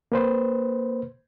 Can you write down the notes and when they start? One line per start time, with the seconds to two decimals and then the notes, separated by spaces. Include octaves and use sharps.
0.12 A#3 B4 C5